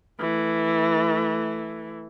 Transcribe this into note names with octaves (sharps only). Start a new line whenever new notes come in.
E3 A3